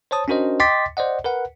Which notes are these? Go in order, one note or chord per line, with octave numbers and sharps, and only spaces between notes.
C5 C#5 A5 D#6
C#4 D4 F#4 A#4 C5 D#5
D#5 G5 C6 D6 A6 B6
C5 D5 D#5 F#5
A#4 B4 F#5